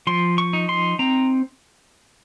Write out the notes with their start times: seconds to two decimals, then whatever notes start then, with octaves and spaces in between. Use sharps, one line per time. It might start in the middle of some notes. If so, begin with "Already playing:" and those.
0.07 F3 C6
0.38 C#6
0.53 D#4
0.69 C6
0.99 C4 A#5